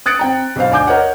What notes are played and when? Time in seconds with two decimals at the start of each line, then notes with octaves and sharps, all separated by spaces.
0.06 D#6 F#6 A6 C#7 D7
0.19 C4 G5 A#5
0.56 B1 B2 C5 F5
0.71 D2 D5 G#5 D6 G6
0.87 A#4 C#5 D#5 F#5